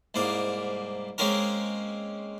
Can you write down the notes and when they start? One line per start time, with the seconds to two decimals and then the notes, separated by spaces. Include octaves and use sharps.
0.14 C2 G#2 A#3 D6
1.18 G#3 A#3 C4 C#4 A#4